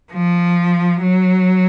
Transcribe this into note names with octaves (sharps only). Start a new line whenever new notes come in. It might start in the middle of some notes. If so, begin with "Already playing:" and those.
F3
F#3